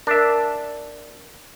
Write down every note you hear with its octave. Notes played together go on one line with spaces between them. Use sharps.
D4 A#4 E5